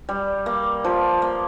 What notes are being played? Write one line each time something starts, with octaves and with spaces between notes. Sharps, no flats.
G3
A#3
F3
A#3